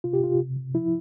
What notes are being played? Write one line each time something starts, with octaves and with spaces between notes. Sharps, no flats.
C3 F4
G4
C3 F4
C3
C3
F3 E4